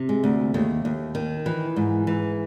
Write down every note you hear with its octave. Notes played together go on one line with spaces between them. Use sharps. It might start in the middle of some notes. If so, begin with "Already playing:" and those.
Already playing: C3
G#3
D2
D#2 A3
D#2
D#3
E3
G#2
E3